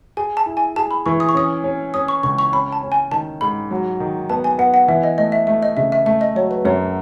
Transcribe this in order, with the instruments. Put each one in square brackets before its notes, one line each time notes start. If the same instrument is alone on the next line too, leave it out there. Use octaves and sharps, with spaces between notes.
[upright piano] G#4 [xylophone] G#5
[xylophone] A5
[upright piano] E4
[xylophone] G#5
[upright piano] G#4 [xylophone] A5
[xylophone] B5
[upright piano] E3 [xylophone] C#6
[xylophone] D#6
C#6
[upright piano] C#4 [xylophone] D#6
[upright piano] C#4
[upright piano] C#4 [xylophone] D#6
[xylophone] C#6
[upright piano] C#2 [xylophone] C#6
[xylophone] C#6
[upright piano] C#4 [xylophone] B5
[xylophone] A5
[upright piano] C#4
[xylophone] G#5
[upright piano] D#3 [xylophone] A5
[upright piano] G#2 [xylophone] B5
[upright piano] F#3
D#3
[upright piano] B3 [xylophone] A5
[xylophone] G#5
[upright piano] B3 [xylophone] F#5
[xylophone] F#5
[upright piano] E3 [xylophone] E5
[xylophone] D#5
[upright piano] A3 [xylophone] D#5
[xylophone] E5
[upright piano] A3 [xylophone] E5
[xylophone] D#5
[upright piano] C#3 [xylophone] E5
[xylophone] E5
[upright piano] A3 [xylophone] E5
[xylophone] D#5
[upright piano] F#3 [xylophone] C#5
[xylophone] B4
[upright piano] F#2 [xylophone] C#5